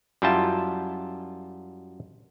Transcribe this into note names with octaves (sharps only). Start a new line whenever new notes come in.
F#2 G3 E4 F4 G5 A5